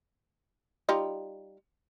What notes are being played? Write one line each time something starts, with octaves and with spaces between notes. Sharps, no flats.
G3 D#4 F4